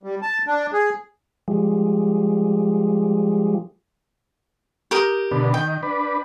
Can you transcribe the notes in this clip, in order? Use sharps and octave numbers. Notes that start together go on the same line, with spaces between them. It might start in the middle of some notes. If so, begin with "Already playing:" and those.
G3
A5
D4
G#4
F3 G3 G#3
G4 A#4 D#6
B2 D3
D#3 G5
D4 B4